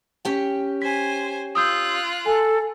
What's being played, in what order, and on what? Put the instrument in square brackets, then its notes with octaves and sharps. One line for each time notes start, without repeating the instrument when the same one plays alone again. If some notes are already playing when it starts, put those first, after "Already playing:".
[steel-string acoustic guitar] C#4 G4 G5
[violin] C5 G#5 [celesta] B6
[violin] F4 F#6 [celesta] D#6 E6 G6
[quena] A4 [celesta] G#5